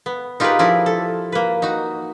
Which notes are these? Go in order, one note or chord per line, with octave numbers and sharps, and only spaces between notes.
B3
D#4 F4 G4 G#4 A#4 B4
F3 E4 A#4 D5
A4
A#3 B4
D#4 F#4